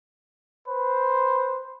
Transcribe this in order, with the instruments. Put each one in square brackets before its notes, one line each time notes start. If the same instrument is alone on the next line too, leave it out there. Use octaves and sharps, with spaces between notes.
[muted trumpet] B4 [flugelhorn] C5